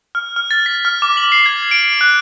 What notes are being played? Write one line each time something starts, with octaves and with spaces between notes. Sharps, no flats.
F6
F6
A6
B6
F6
D6
F#7
C7
G#6
D7
F#6